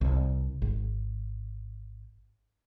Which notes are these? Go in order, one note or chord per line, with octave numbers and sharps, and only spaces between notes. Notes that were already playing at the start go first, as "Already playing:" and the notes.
C2
G#1